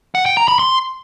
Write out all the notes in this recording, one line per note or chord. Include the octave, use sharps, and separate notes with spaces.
F#5
G5
A#5
B5
C6